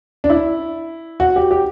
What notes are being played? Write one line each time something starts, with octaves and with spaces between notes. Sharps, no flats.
D4
E4
F#4
G4
G4